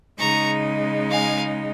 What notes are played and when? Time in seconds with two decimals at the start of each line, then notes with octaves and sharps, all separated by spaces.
0.18 C#3 G#3 D#4 A#5 C#6
1.11 F5 G#5